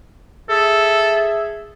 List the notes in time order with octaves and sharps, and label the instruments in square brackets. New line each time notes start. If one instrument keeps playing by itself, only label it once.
[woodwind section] G#4 E5 [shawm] A4